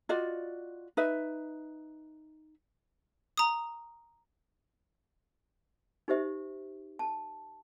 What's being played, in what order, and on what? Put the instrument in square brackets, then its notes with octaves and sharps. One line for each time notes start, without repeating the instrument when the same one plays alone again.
[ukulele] F4 F#4 D5 D#5
D#4 B4 E5
[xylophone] A#5 D#6
[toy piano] D#4 G4 C5 E5
A5